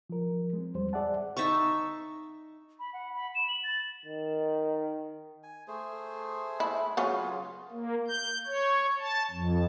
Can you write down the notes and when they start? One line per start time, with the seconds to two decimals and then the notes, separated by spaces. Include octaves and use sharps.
0.10 F3 A#4
0.53 G#3 C4
0.75 E2 G3 C5
0.93 G#4 D5 E5 F#5 A5
1.37 D#4 E5 A5 C#6
2.79 B5
2.94 F#5
3.14 B5
3.35 E7
3.48 F#7
3.64 A6
4.05 D#3
5.43 G#5
5.68 A3 G#4 C5
6.60 E4
6.97 C#3 F#3 C#4 F4 G#4
7.70 A#3
8.08 G6
8.46 C#5
9.00 A5
9.31 F2